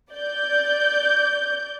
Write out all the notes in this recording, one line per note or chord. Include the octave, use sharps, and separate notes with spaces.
D5 G6